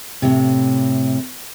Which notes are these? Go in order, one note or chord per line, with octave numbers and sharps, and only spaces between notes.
A2 C3